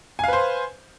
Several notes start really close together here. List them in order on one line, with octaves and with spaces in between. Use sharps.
G#5 F5 B4 C5